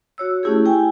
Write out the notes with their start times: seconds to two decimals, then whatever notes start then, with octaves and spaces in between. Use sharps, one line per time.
0.18 F#4 C#5 E6
0.43 A3 C#4 E4 G4 G#4
0.65 G4 G5 G#5